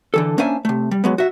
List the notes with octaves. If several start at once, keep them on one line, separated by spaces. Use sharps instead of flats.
D3 E3 A4
A#3 C#4 D4 C5 E5 G#5
C3 A3
G3
F#3 G#3 B3
F#4 E5